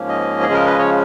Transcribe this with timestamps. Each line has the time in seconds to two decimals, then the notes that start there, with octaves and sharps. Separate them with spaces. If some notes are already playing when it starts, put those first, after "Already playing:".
Already playing: G#2 F3 A#3 C#4
0.09 D#5
0.42 G#4
0.49 C#3 F3 G#3 C#4 A#4
0.66 B4
0.78 C#5